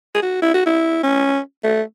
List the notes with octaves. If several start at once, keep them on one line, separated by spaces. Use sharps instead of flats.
G#4
F#4
E4
F#4
E4
C#4
A3